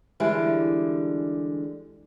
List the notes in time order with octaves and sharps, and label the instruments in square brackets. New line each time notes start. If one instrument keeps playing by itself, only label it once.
[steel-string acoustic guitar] D3 E3 G3 G#3